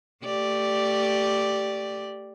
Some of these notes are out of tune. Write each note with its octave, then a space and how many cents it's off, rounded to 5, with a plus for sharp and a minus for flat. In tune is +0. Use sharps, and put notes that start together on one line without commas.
A3 +25 G4 +0 D5 +0